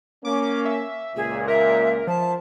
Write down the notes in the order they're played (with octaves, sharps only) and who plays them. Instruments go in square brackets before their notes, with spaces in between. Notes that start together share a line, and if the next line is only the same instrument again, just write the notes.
[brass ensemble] A#3 C#4 [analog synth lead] D6
[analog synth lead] E5
[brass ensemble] C#2 A#2 [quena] G#4
[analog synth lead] A#4 [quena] E5
[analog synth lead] F3 [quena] A5